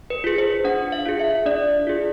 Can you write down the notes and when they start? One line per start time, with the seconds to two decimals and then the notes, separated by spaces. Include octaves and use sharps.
0.10 B4
0.24 F4 G#4
0.38 C5
0.64 D4 F#5
0.92 F5
1.06 F4 G#4
1.19 E5
1.46 D4 D5
1.87 F4 G#4